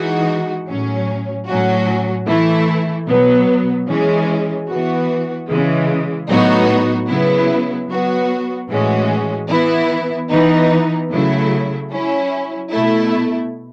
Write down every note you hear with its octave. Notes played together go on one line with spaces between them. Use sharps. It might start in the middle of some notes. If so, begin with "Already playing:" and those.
Already playing: E3 G#3 D#4 F#4
A2 F#3 C#4
A2 F#3 C#4 F#4
E3 A3 E4
B2 F#3 B3
E3 G#3 C#4
E3 B3 F#4
C#3 E3 G#3
A2 F#3 B3 D#4 F#4
C#3 F#3 B3 E4
F#3 B3 F#4
A2 E3 G#3 C#4 F#4
E3 B3 E4
E3 B3 D#4
C#3 F#3 A3 E4
F#3 C#4 E4
B2 A3 E4